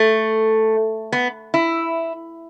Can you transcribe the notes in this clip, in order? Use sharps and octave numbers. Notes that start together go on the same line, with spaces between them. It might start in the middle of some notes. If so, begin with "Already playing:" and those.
Already playing: A3
B3
E4